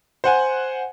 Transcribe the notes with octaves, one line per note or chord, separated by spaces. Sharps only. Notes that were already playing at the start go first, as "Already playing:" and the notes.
C5 F#5 G#5